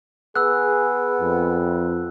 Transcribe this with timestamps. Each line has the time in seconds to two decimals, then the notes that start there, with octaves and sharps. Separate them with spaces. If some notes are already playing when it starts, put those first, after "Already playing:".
0.36 B3 G#4 E6 F#6
1.20 F2